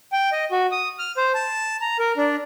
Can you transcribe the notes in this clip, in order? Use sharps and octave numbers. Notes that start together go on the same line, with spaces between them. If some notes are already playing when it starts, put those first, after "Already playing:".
G5
D#5
F#4
D#6
F6
C5
A5
A#5
A#4
D4